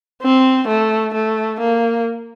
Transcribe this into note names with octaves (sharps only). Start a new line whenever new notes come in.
C4
A3
A3
A#3